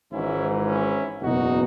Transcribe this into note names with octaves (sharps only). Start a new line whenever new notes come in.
G#1 G#2 E3 C#4 E4
C#4 E4
F#1 E2 B2 D#4 F#4